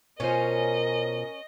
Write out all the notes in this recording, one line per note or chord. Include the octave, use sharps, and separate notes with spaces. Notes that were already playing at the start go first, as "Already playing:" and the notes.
B2 C#4 F4 A#4 C5 D#5